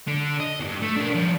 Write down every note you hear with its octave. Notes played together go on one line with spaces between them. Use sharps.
D3
D#5
E2 G2
A3
D4 A#4
F3 G3